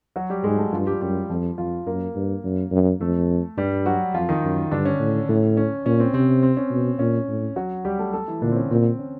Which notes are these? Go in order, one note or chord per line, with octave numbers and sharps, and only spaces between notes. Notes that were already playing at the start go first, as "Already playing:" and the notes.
F#3 F#4
G3 G4
G#2 G#3 G#4
A3 A4
G2 F3 F4
G3 G4
F#2 G3 G4
F2 F3 F4
F2 F3 F4
F#2 A#3 A#4
G2
F#2
F#2
F2 A3 A4
G2 G3 G4
F#3 F#4
F2 F3 F4
D#3 D#4
F#2
G2 D3 D4
C#4
A2
A2
C#4
A#2 C#4
C4
C3 C4
C4
C#4
B2
A#2 C#4
A2
F#3 F#4
G3 G4
A3 A4
A3 A4
E3 E4
A#2 D3 D4
C4
C#4
A#2 C4
C#4